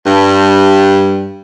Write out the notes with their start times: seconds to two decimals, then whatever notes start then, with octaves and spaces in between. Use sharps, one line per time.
0.05 G2